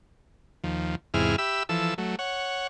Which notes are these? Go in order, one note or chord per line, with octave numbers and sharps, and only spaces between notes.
D#2 F3
E2 G#2 C3 E4 G#4 F6
G4 E5 B5 E6
E3 F3 A4 E6
F#3 A3
C#5 F#5